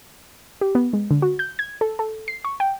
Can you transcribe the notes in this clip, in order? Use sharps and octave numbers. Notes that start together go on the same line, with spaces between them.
G4
B3
G#3
D3
F#4
G6
G#6
A4
A4
C7
C#6
G5